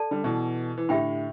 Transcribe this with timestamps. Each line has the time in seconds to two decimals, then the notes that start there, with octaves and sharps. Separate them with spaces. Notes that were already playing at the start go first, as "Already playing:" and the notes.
Already playing: A4 D5 A5
0.11 D3 G3
0.24 B2 E3
0.78 E3
0.89 A2 D3 G4 E5 G5 B5